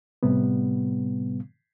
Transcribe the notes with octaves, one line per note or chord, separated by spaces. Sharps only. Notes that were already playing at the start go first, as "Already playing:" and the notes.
A2 C3 G3 B3